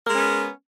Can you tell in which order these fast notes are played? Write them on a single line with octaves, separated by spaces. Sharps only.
A#4 G#3 C#4 B3